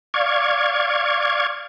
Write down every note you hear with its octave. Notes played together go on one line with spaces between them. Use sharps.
D5 F5 C#6 G#6